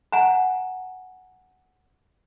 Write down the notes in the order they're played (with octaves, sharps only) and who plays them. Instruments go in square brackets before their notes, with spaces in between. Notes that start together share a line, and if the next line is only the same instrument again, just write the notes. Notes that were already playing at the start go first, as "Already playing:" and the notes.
[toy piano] F#5 G#5 A#5